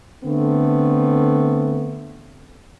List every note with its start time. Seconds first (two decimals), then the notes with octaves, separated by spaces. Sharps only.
0.23 D3 A3 B3 C4